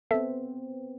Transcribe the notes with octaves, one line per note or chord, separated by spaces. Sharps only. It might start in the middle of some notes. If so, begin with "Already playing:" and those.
B3 C4 A4 E5